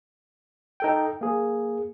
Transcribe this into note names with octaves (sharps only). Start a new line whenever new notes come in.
D#4 A4 G5
A#3 G#4